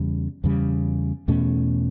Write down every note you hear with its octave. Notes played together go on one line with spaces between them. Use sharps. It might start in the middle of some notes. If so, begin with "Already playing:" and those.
Already playing: E2 C#3 G3
E2 C#3 G3
E2 B2 A3 C#4